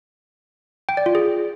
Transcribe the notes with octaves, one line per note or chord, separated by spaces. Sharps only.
G5
D5
F4
G#4